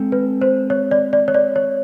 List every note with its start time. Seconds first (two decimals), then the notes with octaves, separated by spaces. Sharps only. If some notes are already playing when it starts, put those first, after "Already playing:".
Already playing: G#3 C4 A4
0.12 B4
0.41 C5
0.70 C#5
0.91 D5
1.13 D5
1.28 C#5
1.34 D5
1.56 C#5